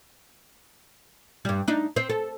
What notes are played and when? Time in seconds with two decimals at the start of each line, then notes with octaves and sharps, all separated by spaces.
1.45 G2 G3
1.68 D4 D#4
1.96 C4 C5
2.10 A4